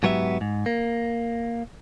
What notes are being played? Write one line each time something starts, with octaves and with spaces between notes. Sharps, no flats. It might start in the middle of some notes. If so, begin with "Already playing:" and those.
G#2 F#3 B3 G4 E5
G#2
A#3